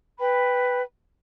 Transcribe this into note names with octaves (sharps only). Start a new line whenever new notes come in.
B4 G5 B5